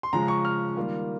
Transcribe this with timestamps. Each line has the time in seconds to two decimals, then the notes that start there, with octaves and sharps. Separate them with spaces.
0.03 C6
0.13 C#3 F3 G#3 C#4 F4 A#5
0.28 C#6
0.45 F6
0.77 D#3 G3 A#3 F4